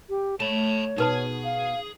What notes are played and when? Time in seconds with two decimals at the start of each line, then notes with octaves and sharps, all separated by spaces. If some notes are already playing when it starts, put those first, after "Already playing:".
0.10 G4
0.40 A3 C#5 A5 B5
0.98 B2 D#4 G#4 B4 A5
1.44 F5